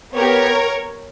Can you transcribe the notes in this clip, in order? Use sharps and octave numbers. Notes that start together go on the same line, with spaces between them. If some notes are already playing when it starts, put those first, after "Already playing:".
B3 G4 A#4 C#5